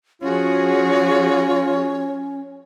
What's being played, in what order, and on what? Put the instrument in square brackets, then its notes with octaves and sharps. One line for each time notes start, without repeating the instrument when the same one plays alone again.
[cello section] F3 F#4 G#4 [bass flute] C#4 [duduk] F4 [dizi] C#5